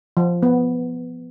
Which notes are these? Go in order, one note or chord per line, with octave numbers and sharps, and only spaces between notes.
F3
B3